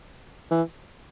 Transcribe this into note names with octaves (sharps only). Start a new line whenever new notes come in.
E3